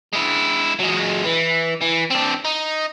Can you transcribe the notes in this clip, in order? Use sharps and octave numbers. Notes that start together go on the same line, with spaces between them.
G#3 E4
F#3 G#3
E3
E3
C4 D4
D#4